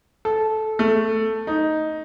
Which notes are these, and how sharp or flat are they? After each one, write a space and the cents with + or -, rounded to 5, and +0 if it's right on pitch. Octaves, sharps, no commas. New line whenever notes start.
A4 -15
A3 +5
D#4 +5